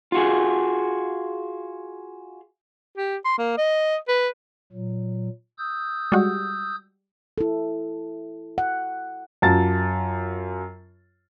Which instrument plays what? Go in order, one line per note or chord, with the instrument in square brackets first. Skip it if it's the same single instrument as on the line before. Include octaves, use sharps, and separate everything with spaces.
[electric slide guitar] F4 F#4 G#4
[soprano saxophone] G4
C6
A#3
D#5
B4
[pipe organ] A#2 F#3
D#6 E6 G6
[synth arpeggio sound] G3 G#3 F#4
[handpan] E4 A4
F#5
[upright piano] F#2 F4 A5 A6